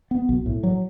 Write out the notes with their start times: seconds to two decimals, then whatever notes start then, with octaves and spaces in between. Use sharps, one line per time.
0.11 B3
0.29 B1
0.46 A2
0.63 F#3